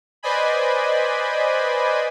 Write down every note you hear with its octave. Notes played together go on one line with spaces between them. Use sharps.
B4 C5 D5 D#5 G#5 B5